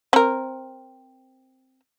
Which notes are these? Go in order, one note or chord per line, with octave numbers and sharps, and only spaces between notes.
C4 A#4